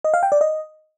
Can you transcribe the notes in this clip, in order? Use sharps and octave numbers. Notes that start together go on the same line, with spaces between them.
D#5
F5
G5
D5
D#5